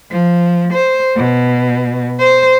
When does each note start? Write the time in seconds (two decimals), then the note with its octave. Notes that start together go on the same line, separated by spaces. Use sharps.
0.11 F3
0.73 C5
1.16 B2
2.19 C5